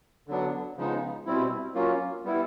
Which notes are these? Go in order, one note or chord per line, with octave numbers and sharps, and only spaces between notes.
D3 F#3 B3 D4
C#3 F3 G#3 B3 D#4
B2 G3 C4 E4
F#3 A#3 C#4 F4
G3 B3 E4